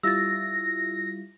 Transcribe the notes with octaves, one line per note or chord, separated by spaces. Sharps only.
G3 E4 F4 E6 A6 A#6